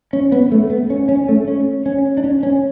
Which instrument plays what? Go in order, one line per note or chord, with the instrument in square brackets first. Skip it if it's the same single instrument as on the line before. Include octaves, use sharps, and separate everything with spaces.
[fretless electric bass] C#4
B3
A3
B3
C#4
C#4
A3
C#4
C#4
D4
C#4
C#4